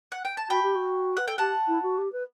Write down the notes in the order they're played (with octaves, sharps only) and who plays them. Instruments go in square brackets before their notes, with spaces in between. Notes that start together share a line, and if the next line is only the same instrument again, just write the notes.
[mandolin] F#5
G5
A5
[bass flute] F#4 [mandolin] G5 B5
[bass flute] G4
F#4
[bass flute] B4 [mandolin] F#5
[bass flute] A4 [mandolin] G5
[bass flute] G4 [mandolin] F#5 A5
[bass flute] E4
F#4
G4
B4